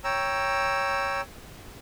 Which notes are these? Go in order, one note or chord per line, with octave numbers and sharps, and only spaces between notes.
C#5 G5 A#5 E6